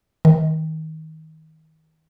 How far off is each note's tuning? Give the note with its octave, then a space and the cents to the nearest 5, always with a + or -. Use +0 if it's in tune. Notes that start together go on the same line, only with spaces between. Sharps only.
D#3 +25